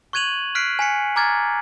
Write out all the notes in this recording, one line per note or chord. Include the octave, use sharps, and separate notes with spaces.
C#6 F#6 G#6 D#7 F7 F#7
F6 F#6 B6 C7 D7
G#5 B6 C#7
A#5 D6 F6 G#6 A6